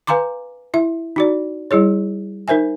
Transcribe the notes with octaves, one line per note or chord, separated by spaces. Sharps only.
B4 F5 G#5 A#5 C6 D6
E4 E5
D#4 F#4 D5
G3 E4 G#4 C#5
D#4 A#4 C5 E5 G#5